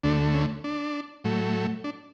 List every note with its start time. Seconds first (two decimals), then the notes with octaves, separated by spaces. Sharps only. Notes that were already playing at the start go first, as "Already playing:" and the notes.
0.04 D2 D3 A3 D4
0.34 C#4
0.64 D4
1.24 A2 F#3 A3
1.84 D4